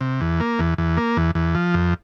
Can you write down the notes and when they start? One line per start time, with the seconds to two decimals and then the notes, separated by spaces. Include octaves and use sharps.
0.01 C3
0.21 E2
0.40 A#3
0.59 E2
0.78 E2
0.97 A#3
1.17 E2
1.35 E2
1.55 F3
1.74 F2